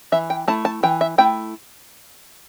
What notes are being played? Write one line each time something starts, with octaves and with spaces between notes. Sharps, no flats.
E3 E5
G5
A3 E4 A5
A5
E3 G5
E5
A3 E4 G5